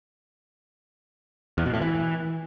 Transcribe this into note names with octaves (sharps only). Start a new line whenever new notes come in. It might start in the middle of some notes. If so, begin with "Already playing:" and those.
E2
B2
A2
E3